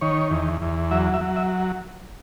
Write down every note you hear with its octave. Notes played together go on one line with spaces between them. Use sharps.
D#3 C#5
E2
E2
F#3 E5
E5
F#3
E5